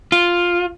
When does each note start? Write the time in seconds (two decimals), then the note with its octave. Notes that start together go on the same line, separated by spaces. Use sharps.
0.12 F4